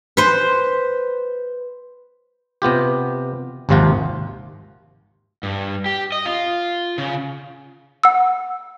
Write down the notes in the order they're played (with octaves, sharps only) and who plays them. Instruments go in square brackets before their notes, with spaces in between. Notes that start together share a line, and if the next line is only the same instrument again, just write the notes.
[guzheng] B4 C5
[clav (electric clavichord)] C3 B3 F4 G4
G#1 D#2 C3 F3 F4 F#5
[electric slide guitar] G2
G4
D#5
F4
C#3
[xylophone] F#5 E6